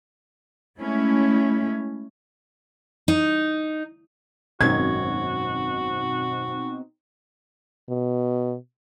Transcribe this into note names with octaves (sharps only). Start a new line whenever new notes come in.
G#3 A3 C#4 E4
D#4
G#1 F#2 B2 C4 D#4 F#4 G#6
B2